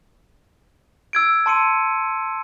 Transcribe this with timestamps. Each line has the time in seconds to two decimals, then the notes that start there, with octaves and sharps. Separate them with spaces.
1.13 E6 G#6 D7
1.46 A5 C6 C#7 D#7